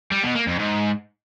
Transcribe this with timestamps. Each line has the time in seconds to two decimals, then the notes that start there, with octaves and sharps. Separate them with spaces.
0.11 G3
0.23 B2
0.35 A#3
0.47 F2
0.59 G#2